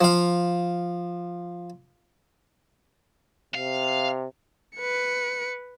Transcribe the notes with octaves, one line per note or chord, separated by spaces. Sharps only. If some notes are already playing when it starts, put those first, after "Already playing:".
F3 F5
C3 F5
B4 C#7